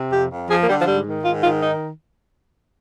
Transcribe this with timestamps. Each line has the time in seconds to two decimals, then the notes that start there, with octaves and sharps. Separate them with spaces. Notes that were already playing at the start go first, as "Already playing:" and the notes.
Already playing: C3
0.12 F2 G4
0.31 F2
0.49 F3 G#4
0.59 A#3
0.68 D3 G3
0.77 F3
0.87 G#2 G3
1.05 D#3
1.24 G#2 F4
1.42 D#3 F4
1.61 D#4